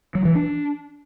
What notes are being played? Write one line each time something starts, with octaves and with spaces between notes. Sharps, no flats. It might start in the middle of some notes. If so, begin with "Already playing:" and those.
F#3
E3
D4